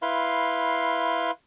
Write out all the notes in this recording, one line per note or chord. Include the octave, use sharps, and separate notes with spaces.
E4 B4 F5 C6